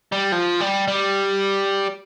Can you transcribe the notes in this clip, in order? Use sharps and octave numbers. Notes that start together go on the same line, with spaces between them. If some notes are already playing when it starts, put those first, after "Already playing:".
G3
F3
G3
G3